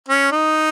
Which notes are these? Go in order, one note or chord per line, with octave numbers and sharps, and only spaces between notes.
C#4
D#4